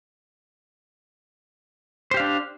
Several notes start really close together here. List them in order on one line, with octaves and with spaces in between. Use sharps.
C5 G4 F5 D4